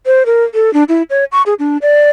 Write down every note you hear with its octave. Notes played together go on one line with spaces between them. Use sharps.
C5
A#4
A4
D4
E4
C#5
C#6
G#4
D4
D5